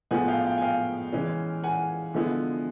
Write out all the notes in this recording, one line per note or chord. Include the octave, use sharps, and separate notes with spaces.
A2 F3 G#3 B3 F#5 G#5
F5 G5
F5 G5
G#5
F5 G5
E3 G#3 C#4
F#5 G#5
D3 F3 G#3 B3 E4